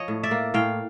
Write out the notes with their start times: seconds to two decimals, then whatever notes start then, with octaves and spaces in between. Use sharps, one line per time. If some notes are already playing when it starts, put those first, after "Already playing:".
Already playing: F3 C#5 D#5
0.08 A2
0.23 D5 E5
0.31 A#3
0.54 A2 F5 G5